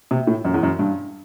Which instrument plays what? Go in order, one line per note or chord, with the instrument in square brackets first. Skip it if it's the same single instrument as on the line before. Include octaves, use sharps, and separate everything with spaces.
[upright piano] C3
A2
F#2
E2
F#2
G2